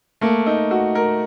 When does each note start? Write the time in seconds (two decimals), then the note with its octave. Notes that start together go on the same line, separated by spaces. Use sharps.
0.21 A3 A#3
0.47 D#4
0.71 F#4
0.95 A#4